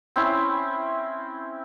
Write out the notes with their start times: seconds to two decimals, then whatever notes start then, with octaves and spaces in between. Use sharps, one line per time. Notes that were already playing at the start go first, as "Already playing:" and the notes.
0.16 C4 C#4 E4